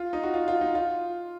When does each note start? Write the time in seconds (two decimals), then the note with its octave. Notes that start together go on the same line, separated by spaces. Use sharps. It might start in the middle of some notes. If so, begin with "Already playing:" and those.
Already playing: F4
0.13 D#4
0.24 F#4
0.34 F4
0.48 F4
0.61 D#4
0.75 F4